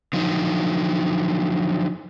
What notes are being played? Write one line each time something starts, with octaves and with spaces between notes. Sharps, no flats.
D3 F3 F#3 D#4